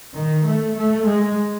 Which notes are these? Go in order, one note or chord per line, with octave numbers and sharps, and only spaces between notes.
D#3
A3
A3
G#3